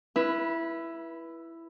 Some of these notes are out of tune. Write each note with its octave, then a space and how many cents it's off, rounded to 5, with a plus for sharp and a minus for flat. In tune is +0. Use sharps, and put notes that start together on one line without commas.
E4 +10 B4 -20